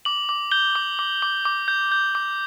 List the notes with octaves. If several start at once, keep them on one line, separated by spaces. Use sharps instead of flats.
D6 F#7
D6
G6 G7
D6
D6
D6
D6
G6
G6
D6